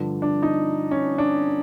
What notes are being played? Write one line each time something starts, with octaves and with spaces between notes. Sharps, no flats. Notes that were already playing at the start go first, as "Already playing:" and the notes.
Already playing: G2 D3 F3
D4
D#4
C#4
D4